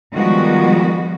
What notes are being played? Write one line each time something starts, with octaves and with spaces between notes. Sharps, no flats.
D#3 F3 G3 G#3 B3 F#4